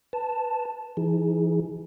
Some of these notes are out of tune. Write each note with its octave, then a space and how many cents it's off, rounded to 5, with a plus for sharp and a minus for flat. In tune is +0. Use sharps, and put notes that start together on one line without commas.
B4 +0 A5 +0
E3 +30 D#4 +35 G#4 +0